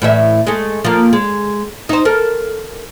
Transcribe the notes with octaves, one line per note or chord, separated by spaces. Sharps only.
A2 E3 E5
G#3 A3
F3 A#3
G#3
D#4 C5
A4 A#4